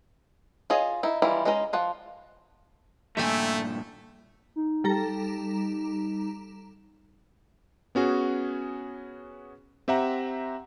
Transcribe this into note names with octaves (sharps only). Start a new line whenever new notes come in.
F4 G#4 C#5 D#5
D#4 E4
D#3 E3 G3 E4 F4
G#3 C#4 D#4 A#4 D#5
F3 F4 F#5
G2 A#2 A3 E5 G5 G#5
D#4
G3 A4 A#5
B3 C#4 F#4 G#4
C4 G4 E5 F#5 A#5